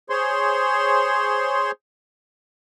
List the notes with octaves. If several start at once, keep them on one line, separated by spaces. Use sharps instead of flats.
G#4 C5 C#5 C6